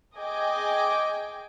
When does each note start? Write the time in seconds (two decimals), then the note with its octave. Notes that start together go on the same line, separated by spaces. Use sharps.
0.18 G#4 D#5 G5 G#5 D6